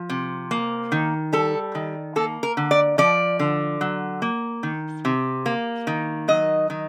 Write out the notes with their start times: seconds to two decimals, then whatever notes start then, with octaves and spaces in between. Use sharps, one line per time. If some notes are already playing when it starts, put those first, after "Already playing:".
Already playing: F3
0.10 C3
0.51 A#3
0.92 D#3
1.33 G3 A4
1.75 D#3
2.16 A#3 A4
2.43 A#4
2.57 D3
2.71 D5
2.98 F3 D5
3.39 D3
3.81 F#3
4.22 A#3
4.63 D#3
5.05 C3
5.46 A#3
5.87 D#3
6.28 F#3 D#5
6.70 D#3